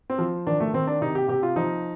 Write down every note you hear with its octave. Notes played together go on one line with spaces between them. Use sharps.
C4
F3
D#3 D4
A3
D#3 C4
D4
C3 D#4
G4
C3 G4
F4
F3 D#4